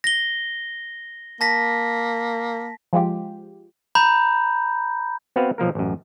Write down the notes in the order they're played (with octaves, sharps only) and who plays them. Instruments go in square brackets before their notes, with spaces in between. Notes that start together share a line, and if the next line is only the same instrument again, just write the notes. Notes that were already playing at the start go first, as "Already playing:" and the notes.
[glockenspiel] A#6 G7
[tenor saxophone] A#3 [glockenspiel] A5 A#6 B6
[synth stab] F3 G#3 F4 G4
[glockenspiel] A#5 B5 G6
[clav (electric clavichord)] B3 C4 F#4 B4 F5
B1 F3 A#3 A#4
A1 F#2